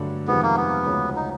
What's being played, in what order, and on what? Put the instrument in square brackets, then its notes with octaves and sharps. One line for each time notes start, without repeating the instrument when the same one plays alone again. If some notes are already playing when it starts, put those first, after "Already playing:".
Already playing: [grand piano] G2 D3 F#3 A3 D4
[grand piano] F2 C3 D#3 G#3 [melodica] B3
[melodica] A#3
B3
[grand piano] D2 C#3 F3 G#3 C#4
[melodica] D#4